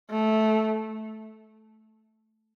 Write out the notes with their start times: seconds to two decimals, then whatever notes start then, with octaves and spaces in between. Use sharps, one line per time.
0.11 A3